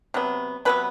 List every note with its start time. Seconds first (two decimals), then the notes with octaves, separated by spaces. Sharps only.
0.14 C3 F#3 B3
0.65 C3 F#3 B3 B4